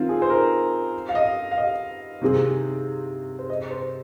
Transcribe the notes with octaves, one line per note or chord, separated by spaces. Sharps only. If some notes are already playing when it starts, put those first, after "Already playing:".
Already playing: D#3 C4 F4
G#4
C5
A#4
F5
D#5
F5
D#5
C3 D#3 C4 G#4
C5
D#5
C5